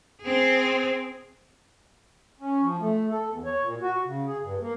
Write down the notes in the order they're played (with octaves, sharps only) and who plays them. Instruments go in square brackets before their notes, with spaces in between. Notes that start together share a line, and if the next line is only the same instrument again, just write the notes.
[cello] C4 G#4
[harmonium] C#4
F3
A3
A4
E2
C#5
A#2
F#4
C#3
G#4
G2
A#3